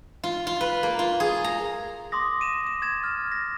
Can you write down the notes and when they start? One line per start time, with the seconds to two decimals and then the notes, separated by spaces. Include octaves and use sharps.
0.24 F4
0.47 F4
0.61 B4
0.83 A#3
0.99 F4
1.20 G#4
1.44 A#5
2.12 C6 D6 D#6 A#6
2.41 D#7 E7
2.67 D#7
2.82 G#6 A6 E7
3.04 F6
3.32 A#6